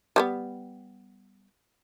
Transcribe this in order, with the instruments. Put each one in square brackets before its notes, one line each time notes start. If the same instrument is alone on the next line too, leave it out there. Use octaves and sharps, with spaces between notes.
[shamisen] G3 A3 B3